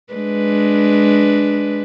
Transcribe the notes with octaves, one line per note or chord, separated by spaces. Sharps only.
G#3 D4 B4